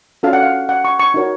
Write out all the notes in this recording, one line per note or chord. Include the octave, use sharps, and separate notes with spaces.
C#4 F#4 A4 F5
F#5
F5
F#5
C#6
C#6
D#4 F#4 A#4 C#5